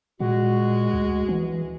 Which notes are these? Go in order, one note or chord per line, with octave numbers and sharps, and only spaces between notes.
A#2 G#3 F#4
D2
E3